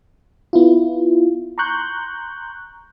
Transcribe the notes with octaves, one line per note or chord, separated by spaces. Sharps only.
B3 E4 F4
A#5 C6 C#6 F#6 G6